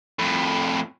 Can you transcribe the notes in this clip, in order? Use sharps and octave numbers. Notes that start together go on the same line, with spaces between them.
F2 A2